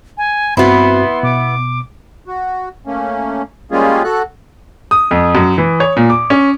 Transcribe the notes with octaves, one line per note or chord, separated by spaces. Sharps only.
G#5
G2 B3 C4 E4 F#4 C6
B2 D6
F#4
A3 A#3 C#4
G3 G#3 A#3 C#4 F4 G#4
F#4 A4 F#6
D#6
F2
F#2
E3
C#5
A#2
D6
C#4